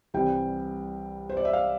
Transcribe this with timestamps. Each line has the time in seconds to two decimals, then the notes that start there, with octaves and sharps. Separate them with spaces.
0.14 C2 C3 E3 G3 G5
1.29 C5
1.37 D5
1.45 E5
1.53 F5